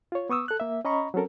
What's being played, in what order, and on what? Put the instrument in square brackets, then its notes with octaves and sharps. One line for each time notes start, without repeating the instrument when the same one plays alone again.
[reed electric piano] F4 C#5
B3 C#6 D#6 E6
A4 F#6
A#3 E5
C#4 D#5 A#5 B5 C#6
F#3 C4 C#4 A4 A#4